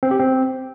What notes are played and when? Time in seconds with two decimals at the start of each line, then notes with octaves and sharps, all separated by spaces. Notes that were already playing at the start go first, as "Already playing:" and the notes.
0.03 C4
0.11 G4
0.19 C4